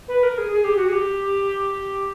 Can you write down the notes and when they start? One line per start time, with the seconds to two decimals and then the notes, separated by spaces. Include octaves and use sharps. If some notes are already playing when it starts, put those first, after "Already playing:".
0.08 B4
0.23 A#4
0.38 G#4
0.52 G#4
0.64 G4
0.77 F#4
0.89 G#4
0.92 G4